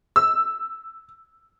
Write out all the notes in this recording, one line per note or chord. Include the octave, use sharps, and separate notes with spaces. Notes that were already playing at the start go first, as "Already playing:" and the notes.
E6